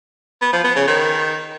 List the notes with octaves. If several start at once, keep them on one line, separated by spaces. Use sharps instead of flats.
B3
F3
B3
C#3
D#3